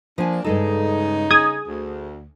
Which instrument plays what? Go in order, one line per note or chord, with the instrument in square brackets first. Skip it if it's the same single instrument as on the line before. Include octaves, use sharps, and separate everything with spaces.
[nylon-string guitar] F3 G#5 [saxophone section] A#3 D4
[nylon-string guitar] G2 G#3 A4 [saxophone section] C#3 D#4
[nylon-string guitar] G#4 [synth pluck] D#6 G#6
[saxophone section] D2